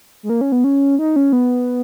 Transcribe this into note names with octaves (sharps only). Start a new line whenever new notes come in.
G#3
A#3
C#4
B3
C#4
D#4
C#4
B3